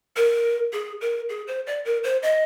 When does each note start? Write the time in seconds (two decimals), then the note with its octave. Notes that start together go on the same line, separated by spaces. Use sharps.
0.17 A#4
0.73 G#4
1.01 A#4
1.29 G#4
1.47 C5
1.67 D5
1.85 A#4
2.04 C5
2.23 D#5